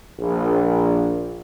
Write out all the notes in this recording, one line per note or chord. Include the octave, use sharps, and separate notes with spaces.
A#1